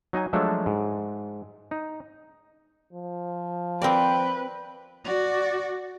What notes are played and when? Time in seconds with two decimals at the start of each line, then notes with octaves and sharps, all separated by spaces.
0.13 F#3 D#4 D#5 G#5
0.33 F3 F#3 G#3 A3 D4 A4
0.66 G#2
1.71 D#4
2.93 F3
3.82 C4 A#4 B4 D5 G5
5.04 F#4 D5